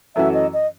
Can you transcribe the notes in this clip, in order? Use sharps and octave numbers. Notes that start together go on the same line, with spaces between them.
F#2 E3 A3 C#4 F#4 E5
D#5
D#5